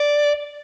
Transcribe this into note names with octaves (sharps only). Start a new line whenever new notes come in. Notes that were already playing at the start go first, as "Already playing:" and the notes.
Already playing: D5